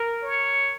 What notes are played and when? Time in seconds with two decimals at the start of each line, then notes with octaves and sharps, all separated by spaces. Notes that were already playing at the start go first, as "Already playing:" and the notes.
Already playing: A#4
0.23 C#5